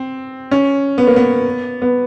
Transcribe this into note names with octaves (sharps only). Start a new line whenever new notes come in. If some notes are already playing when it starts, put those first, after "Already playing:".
Already playing: C4
C#4
B3
A#3
B3
B3